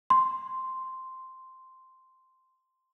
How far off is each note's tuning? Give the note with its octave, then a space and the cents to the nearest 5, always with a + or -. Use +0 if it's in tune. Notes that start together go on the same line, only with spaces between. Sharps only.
C6 -5